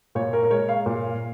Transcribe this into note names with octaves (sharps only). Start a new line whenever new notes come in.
A#2 C#5
A#4
A#4
G#3 C#5
F5
A#2